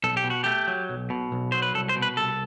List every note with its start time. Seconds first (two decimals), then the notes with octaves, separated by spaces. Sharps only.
0.04 B1 A4
0.17 G4
0.24 B2
0.30 F#4
0.44 A3 G4
0.67 F#3
0.89 B1
1.10 B2
1.32 B1
1.52 F#3 C5
1.62 B4
1.74 C2 A4
1.89 C5
1.96 B2
2.02 B4
2.17 C2 A4